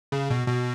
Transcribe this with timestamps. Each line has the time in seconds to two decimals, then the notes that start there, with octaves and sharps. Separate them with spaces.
0.12 C#3
0.30 B2
0.47 B2